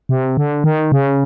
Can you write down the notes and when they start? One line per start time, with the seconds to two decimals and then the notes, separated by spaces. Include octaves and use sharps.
0.09 C3
0.37 D3
0.64 D#3
0.92 C#3